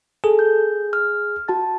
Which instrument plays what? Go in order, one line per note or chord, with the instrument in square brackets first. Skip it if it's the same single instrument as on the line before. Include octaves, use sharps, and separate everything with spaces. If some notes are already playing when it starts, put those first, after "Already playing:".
[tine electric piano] G#4 [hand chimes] A4
[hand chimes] G6
F6
F#4 A5 A6